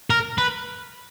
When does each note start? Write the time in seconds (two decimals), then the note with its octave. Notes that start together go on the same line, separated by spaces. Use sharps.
0.10 A#4
0.38 B4